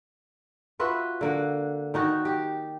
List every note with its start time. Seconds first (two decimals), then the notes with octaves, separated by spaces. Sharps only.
0.80 F4 F#4 B4 E5
1.21 D3 A#3 F#5
1.94 D#3 D#4 F#4
2.25 G4